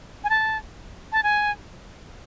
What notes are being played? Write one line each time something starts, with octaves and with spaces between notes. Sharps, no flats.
G#5
A5
A5
G#5